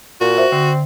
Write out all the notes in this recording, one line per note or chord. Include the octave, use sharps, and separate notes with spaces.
A#2 F#4
C5 E5
D3 C4